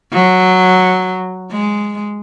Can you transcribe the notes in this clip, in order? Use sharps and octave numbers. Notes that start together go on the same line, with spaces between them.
F#3
G#3